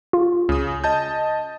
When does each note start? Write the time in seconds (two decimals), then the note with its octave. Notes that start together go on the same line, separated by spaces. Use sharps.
0.13 F4
0.49 C#2 C#3 D#6
0.84 D#5 A5 G6